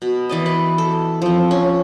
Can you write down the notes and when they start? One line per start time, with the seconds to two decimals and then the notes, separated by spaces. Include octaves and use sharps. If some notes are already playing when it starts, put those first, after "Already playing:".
0.02 B2
0.29 E3 D5 D#5
0.46 B4
0.78 A4
1.22 F3 C4
1.51 C#4